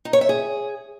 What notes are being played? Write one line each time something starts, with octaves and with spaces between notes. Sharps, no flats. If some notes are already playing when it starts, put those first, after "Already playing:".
D#4
C#5
E5
G#4